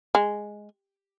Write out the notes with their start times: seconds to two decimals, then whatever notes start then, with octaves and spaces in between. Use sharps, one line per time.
0.15 G#3